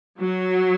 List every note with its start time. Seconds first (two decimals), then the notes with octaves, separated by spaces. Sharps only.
0.19 F#3